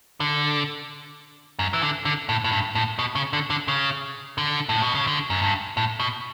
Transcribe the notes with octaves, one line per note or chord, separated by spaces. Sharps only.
D3
F#2
E3
D3
D3
A2
A2
G2
A2
B2
C#3
D3
D3
C#3
D3
A2
B2
C#3
D3
F#2
G2
A2
B2